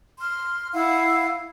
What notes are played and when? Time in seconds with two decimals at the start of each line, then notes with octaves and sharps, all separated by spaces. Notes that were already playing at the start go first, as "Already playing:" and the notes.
0.18 C6 F6
0.72 E4 F5 F#5